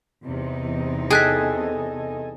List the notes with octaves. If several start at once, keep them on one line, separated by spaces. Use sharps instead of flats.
E2 C3 D#4
G#4 A4 D#5 G5 G#5 F#6 B6